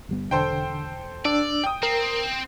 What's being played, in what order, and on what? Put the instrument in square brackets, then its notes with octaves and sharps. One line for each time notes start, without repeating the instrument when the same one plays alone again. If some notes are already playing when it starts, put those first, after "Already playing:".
[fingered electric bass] G1 G3 B3
[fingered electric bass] E1 [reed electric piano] D3 [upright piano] A4 C5 G5
[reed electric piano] D4 E6 [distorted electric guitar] D5
[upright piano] G5 D#6
[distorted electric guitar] C4 [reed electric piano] A#4